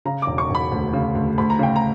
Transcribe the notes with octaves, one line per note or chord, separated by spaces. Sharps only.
C#3 A#5
D6
E1
C#6
E1 B5
D2
C#3
D2
D2 B5
A#5
C#3 G5
A#5